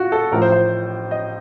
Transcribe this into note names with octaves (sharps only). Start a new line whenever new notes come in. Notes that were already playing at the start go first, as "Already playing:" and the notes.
Already playing: F4 F#4
A4
A1 A2 F3 A#4
C5
C5
D#5